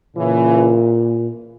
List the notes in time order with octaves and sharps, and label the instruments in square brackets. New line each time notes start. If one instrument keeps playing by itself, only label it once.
[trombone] A#2 [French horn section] C#3 E3